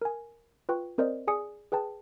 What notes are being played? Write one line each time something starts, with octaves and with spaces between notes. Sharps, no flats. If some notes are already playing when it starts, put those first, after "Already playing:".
A#4 G#5
F4 B4 G5 C#6
C4 A#4 C5 D5 D#5
G#4 D5 G#5 D#6 C#7
G#4 B4 G5 A5